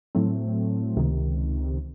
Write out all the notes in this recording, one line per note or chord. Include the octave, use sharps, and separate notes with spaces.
A2 F#3 A3 C4
C#2 C3 D#3